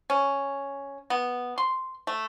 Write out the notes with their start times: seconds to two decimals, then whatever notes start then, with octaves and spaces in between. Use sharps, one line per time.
0.10 C#4
1.10 B3
1.58 C6
2.07 A3